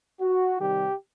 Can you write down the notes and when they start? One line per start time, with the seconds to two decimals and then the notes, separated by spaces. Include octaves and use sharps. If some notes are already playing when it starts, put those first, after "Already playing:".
0.21 F#4
0.60 C3 D#3 G3 G4